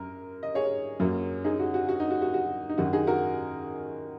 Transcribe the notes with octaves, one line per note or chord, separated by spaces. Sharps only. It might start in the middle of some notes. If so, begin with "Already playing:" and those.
Already playing: F#2 A#4
D#5
G#4 C#5
F#2 F#3 A#3
D#4 G#4
F#4
F#4
F#4
D#4
F#4
F#4
F#4
D#4
F#2 D#3 F#3 F#4
D#4 G#4
F#4 A#4